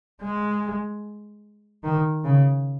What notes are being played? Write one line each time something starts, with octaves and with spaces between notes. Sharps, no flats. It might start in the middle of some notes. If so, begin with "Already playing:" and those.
G#3
D#3
C#3